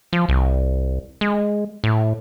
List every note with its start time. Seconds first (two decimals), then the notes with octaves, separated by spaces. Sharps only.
0.13 F3
0.29 C2
1.21 G#3
1.84 A2